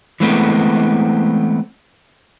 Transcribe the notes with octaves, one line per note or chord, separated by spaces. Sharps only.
E3 G#3 A3 B3 C4